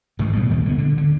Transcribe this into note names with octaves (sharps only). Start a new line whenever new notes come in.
A1 G#2 C3 D#3
B2 G3 G#3
D#2 A#2 D#3 G#3
D3 B3
D3
D3